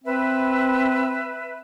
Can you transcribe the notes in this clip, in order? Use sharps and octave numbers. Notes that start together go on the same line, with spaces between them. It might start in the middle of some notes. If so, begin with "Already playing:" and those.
C4 B4 E5